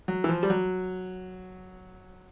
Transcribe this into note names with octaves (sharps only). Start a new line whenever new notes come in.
F#3
E3
F3
G3
F#3